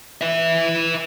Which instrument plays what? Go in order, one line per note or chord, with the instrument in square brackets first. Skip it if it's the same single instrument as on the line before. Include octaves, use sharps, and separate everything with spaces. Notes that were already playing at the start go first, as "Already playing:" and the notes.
[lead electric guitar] B4 E5